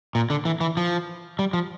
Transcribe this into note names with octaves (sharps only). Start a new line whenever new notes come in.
A#2
D3
E3
E3
F3
G3
F3